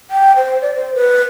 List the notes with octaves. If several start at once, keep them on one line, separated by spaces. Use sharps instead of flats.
G5
C5
D5
C5
B4